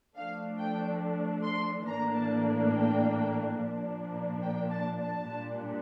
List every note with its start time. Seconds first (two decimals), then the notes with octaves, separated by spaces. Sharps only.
0.16 F3 A3 D4 F5
0.59 G5
1.43 C6
1.86 A2 E3 A#3 D4 A#5
2.15 A5
2.72 G5
3.57 A#2 F3 A#3 D4
4.43 G5
4.71 A5
5.00 A5
5.27 A#2 G3 D4